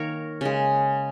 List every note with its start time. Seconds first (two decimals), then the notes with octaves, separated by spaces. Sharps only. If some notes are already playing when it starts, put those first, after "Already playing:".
Already playing: D#3 A#3 A#4 C#5
0.41 C#3 G#3